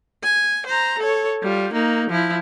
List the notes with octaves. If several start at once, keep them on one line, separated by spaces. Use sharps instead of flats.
G#5
C5 A#5
A4 C#5
G3 F4
A#3 D#4
F3 E4